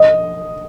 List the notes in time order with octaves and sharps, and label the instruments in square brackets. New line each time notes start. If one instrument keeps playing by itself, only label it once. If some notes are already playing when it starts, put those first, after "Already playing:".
Already playing: [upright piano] D#5